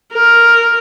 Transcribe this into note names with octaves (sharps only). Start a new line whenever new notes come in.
A#4